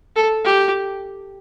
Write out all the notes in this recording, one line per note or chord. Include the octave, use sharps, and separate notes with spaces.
A4
G4